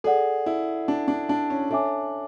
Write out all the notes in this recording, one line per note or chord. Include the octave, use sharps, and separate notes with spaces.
G#4 A4 D5 F#5
E4
D4
D4
D4
C#4
D4 A4 C#5 E5 G#5 D6